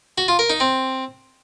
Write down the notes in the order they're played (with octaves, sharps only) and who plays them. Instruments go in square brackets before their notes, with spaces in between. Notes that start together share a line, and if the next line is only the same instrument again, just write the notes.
[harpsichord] F#4
F4
A#4
D#4
C4